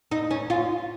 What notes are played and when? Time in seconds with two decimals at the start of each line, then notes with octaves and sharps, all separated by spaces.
0.11 D#4
0.31 C#4
0.50 F4